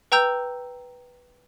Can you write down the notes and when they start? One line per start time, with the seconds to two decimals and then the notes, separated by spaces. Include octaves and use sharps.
0.12 B4 G5 A#5 E6 G6